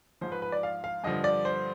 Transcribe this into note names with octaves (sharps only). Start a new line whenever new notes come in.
G#2 F3 C5
B4
B4
D5
F5
F5
G2 D3 F3 D#5
D5
C5